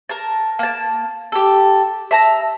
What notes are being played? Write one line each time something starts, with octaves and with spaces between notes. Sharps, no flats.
A#4 A5
A#3 A5
G4 A4
E5 A5 A#5